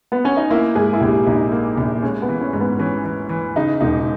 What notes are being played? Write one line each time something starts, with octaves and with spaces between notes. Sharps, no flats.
B3
C#4
D#4
A#3 E4
G#2 G#4
E4
A#1 G4
A#1 D#4
A#3
A#1
G#3 C#4
B3
E3
C#4
G#2
B3
E3 C#4
E3
E3
C#3 D#4
E1 D#4